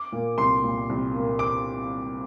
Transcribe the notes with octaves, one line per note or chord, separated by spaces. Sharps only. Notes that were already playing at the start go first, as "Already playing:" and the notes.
Already playing: D6
A#2 A#3
C2 C6
A#2 A#3
C2
A#2 A#3
D6